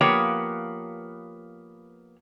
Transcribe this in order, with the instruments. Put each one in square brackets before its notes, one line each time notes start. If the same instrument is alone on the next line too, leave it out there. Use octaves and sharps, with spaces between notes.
[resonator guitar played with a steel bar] F3 A#3 B3 G4 B4 C#5